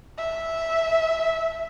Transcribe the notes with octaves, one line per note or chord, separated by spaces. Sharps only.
E5